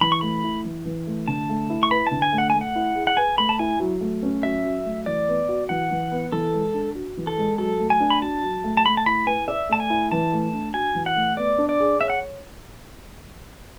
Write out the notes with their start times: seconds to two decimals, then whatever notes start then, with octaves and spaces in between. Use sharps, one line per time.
0.01 E3 B5
0.12 C#6
0.21 A3 B5
0.44 E4
0.65 E3
0.85 E3
1.07 A3
1.28 D3 A5
1.49 A3
1.70 E4
1.83 C#6
1.91 B4 B5
2.07 D3 A5
2.22 G#5
2.32 A3
2.38 F#5
2.50 A3 G#5
2.61 F#5
2.76 E4
2.95 G#4
3.07 F#5
3.17 B4 G#5
3.38 A3 B5
3.49 A5
3.59 E4 G#5
3.80 F#3
4.01 A3
4.23 C#4
4.43 F#3 E5
4.64 F#3
4.85 A3
5.06 E3 D5
5.28 B3
5.49 F#4
5.69 E3 F#5
5.91 E3
6.12 B3
6.32 E3 A4
6.53 G#3
6.74 D4
6.95 F#4
7.17 E3
7.27 A4
7.38 G#3
7.58 F#3 A4
7.79 A3
7.90 G#5
8.00 D4
8.10 B5
8.22 F#4 A5
8.43 F#3
8.64 A3
8.77 A5
8.86 A3 B5
8.97 A5
9.06 E4 B5
9.26 B4 G#5
9.48 D5 E5
9.69 A3 A5
9.80 G#5
9.90 E4
10.12 E3 A5
10.33 A3
10.53 D4
10.74 F#4 G#5
10.95 E3
11.06 F#5
11.16 A3
11.37 B3 D5
11.58 D4
11.69 D5
11.80 G#4
12.01 C#5 E5
12.10 F#5